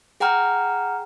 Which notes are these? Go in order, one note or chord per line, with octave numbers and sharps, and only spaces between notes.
G#4 F#5 G5 A#5 F6